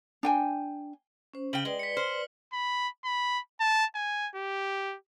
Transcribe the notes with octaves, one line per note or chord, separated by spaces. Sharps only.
D4 G5 G#5
C#4 C5
C#3 G5 F#7 G7
G#3 B4 D5
B6 C#7
C5 F6 G7
B5
B5
A5
G#5
G4